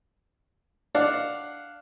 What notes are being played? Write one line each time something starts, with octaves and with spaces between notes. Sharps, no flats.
D4 F5 F#5